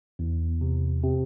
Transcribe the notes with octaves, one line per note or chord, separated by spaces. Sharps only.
E2
C3
C3